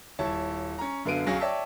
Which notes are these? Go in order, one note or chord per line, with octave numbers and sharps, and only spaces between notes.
D#1 E4 C#5 A5
C#4 A#5
F#2 D3 B3 F5 D7 D#7
B1 F#3 C#4 G#4 F5 A#6
C#5 D5 E5 G5 A5